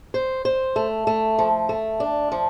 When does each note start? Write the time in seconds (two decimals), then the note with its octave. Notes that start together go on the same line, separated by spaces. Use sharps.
0.14 C5
0.45 C5
0.76 A3
1.07 A3
1.39 F3
1.69 A3
2.00 D4
2.32 F3